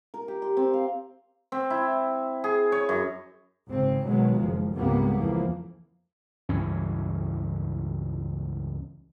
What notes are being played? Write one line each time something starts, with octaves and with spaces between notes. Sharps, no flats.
A#4
G4
C6
C4
F5
C4
E4
G#4
C#5
F#2
G#1 C#3 C4
B2 D#3 F#3 G#3
F#1 F3
C#2 G#2 C3 G3 A#3 B3
F2 E3 F3 A#3
C#2 G2 E3 C#4